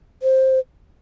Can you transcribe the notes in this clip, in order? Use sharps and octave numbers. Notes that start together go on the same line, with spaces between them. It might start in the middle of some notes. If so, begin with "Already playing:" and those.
C5